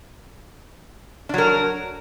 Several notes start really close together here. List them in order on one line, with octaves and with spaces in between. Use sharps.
D4 F#3 A#4